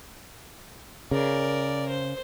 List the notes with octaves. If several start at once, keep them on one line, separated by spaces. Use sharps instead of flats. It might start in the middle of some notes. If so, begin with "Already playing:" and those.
C#3 A#4 D5
C5